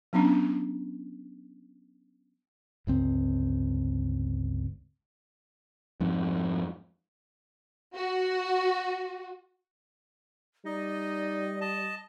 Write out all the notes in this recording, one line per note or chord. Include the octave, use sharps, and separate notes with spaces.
F#3 B3 C#4 D4
G1 C#2 C4
F2 G#2
F#4
G3 D#4 D5 D#5
D#5 A5